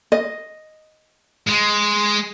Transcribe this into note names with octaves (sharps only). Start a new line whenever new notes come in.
D#5
G#3